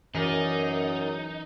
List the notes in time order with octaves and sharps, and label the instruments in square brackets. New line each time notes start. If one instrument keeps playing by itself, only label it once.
[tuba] F#2 [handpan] E3 [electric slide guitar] D#4 [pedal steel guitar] G#4 A#4 D5